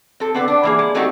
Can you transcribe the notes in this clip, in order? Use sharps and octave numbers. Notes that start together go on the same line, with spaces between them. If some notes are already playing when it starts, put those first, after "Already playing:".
C4 A4
D3 B3 C4
D4
E3 A#3 G#4
G#3
F#3 A3 C4 D#4 F#4 G4